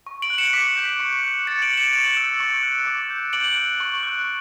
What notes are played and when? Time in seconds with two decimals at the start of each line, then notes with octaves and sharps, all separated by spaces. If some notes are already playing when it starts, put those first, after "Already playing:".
0.07 C#6
0.22 D7 F#7
0.30 F#6
0.38 C#7 E7
0.53 D6 B6
0.77 G6
1.00 C#6
1.24 F#6
1.47 D6 A6 C#7
1.62 D7 F#7
1.69 F#6
1.77 C#7 E7
1.93 C#6 D7 F#7
2.17 E6 G6
2.40 C#6
2.63 F#6
2.87 D6
3.10 G6
3.33 D6 D7 F#7
3.56 F#6
3.80 C#6
4.03 F#6